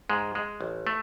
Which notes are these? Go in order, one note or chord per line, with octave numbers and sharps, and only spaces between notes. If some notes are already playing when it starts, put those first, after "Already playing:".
G#2 G#3
G#3
A1
A3